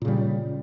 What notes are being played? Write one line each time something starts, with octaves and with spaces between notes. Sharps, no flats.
A#2 C#3 G3